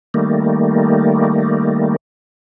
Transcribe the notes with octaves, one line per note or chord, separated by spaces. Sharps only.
D#3 G3 A3 A#3